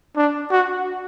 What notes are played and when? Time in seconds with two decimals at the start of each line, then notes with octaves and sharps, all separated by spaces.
0.16 D4
0.51 F#4